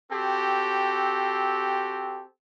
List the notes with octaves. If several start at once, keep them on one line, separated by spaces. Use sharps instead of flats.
C4 F#4 G4 A4